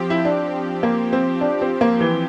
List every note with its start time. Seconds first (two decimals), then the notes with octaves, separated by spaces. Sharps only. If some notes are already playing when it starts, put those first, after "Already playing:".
Already playing: F3 C4 G4
0.10 E4
0.25 D4
0.83 A#3
1.13 C4
1.41 D4
1.62 C4
1.81 A#3
2.00 E3